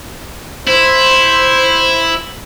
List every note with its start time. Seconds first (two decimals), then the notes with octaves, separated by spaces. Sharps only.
0.67 E4 C5